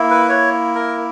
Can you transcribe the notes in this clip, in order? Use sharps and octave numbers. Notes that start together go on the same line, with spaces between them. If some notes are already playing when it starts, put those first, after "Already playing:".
Already playing: A#3 E4
B4
C#5
A#4